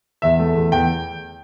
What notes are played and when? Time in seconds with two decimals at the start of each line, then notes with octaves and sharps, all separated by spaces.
0.22 E2 E5
0.39 A3
0.55 E2
0.72 E2 G5